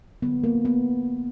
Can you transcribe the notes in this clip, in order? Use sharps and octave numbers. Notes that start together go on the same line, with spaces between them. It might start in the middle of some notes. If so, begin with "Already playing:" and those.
D3 F#3 A#3 B3
A#3
B3